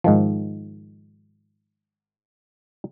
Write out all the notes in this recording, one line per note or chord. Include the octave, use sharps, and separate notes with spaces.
G#2 D#3 F3